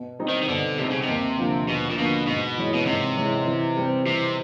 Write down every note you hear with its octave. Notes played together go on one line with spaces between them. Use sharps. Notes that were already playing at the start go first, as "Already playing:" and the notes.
Already playing: B2
G3 C4 D#4
D#3
D#3
B2 D3
C3 G3 C4 D#4
C#3
C3
D#2
D3 F3 A#3
D#2 B2
A#2
B2 D3 F3 A#3
G#2 B2
E3 G#3 C#4
B2
G#2 C3
E3 G#3 C#4
E3
G3 C4
C3 E3